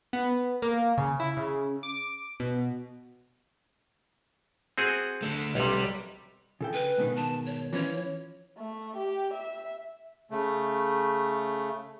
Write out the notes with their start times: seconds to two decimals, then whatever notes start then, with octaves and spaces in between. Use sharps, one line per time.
0.13 B3
0.62 A#3
0.98 C#3
1.20 E4
1.37 C#3
1.83 D6
2.40 B2
4.78 C4 F#4 G#4
5.22 D3 A3
5.55 B1 C3 G3
6.61 C#3 A4 G5
6.73 B4
6.98 G#2 B2 D#3
7.16 A5
7.46 C#5
7.73 E3 F3 C#4 C#5
8.58 A3
8.96 G4
9.34 E5
10.31 C#3 A3